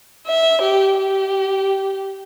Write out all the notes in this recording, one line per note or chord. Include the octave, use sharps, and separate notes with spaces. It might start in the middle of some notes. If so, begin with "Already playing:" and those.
E5
G4
G4